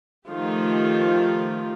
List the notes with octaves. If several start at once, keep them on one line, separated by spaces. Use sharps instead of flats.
D#3 F3 A3 F4 G4